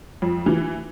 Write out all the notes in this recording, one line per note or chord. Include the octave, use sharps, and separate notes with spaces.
F2
E3